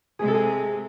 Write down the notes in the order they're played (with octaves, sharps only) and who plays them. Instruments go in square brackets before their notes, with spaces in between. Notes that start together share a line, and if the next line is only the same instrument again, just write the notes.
[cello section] C3 G#3 [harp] G#4
[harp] A4
G#4